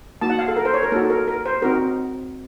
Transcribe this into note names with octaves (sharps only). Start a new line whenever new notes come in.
A#3 D#4 F#4 A5
F#5
F5
A4
A#4
C5
C#5
A#4
A#3 D#4 F#4 A4
A#4
A#4
C5
C4 D#4 F#4 A#4